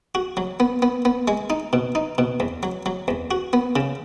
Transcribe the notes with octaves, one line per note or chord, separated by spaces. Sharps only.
F#4
F#3
B3
B3
B3
G#3
D#4
B2
D#4
B2
E2
F#3
F#3
E2
F#4
B3
C#3